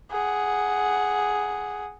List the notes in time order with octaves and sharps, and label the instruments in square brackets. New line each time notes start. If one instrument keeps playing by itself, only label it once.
[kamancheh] G#4 F#5